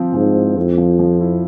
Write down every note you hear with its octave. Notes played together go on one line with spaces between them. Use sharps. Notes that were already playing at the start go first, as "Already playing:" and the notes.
Already playing: F3 C4
G#2 F3
E4
F2 C4
F3
F3
E4